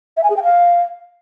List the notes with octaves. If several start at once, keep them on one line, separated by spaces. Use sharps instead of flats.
E5
G#5
G#4
G5
F5